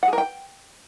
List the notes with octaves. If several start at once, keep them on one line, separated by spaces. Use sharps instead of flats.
F#5
G#4
A#4
G5